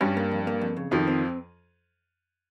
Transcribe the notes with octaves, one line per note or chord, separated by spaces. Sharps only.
G2 G3 C#4
A#3
F2
A#3
F2
C#3
F2 D#3 F3
C4